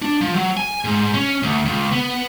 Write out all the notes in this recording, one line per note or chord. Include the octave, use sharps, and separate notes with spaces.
D4
F3
F#3
G#5
G#2
C#4
D2
C#2
B3